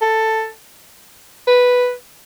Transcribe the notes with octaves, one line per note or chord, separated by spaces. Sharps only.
A4
B4